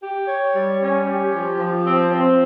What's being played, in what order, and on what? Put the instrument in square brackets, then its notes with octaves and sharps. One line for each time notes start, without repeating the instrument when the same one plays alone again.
[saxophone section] G4
C#5
G3
C#4
G4
F3
F3
C4
C4